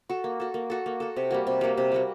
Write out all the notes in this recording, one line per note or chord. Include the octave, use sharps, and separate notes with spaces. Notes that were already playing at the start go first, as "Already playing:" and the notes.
F#4 A4
A#3
F#4 A4
A#3
F#4 A4
A#3
F#4 A4
C3
G3 A#3 F#4
C3
G3 A#3 F#4
C3
G3 A#3 F#4